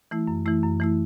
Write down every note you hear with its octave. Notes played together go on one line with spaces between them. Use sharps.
E3 A3 E4
F#2
E3 A3 E4
F#2
E3 A3 E4